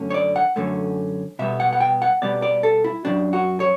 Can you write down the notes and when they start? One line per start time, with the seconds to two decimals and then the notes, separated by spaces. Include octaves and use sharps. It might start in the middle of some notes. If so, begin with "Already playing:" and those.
Already playing: F#2 D3 A3 C#4
0.10 C#5
0.14 D5
0.36 F#5
0.56 F#2 D3 A3 C#4
1.39 B2 G3 B3 E5
1.60 F#5
1.73 F#5
1.80 G5
2.02 F#5
2.22 B2 G3 B3 D5
2.42 D5
2.63 A4
2.84 E4
3.05 F#2 C#3 F#3 D4
3.33 F#4
3.60 C#5